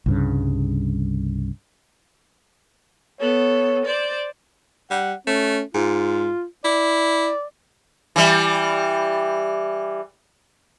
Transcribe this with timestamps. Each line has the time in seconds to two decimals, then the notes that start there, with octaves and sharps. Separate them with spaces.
0.06 C2 G2 C#3
3.20 B3 A4 C#5
3.85 C5 D5
4.91 G3 F#5
5.27 A3 C#4
5.74 G#2 F4
6.64 E4 D5
8.16 E3 G3